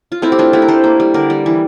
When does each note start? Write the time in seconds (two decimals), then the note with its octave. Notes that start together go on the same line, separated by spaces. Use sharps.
0.12 F4
0.22 A3 C4 E4
0.32 G4
0.39 A3 D4 F4
0.53 A3 E4 G4
0.62 A#4
0.68 A3 A4 C5
0.84 A#3
1.00 G3
1.14 D3 A#4 D5
1.30 G3
1.46 E3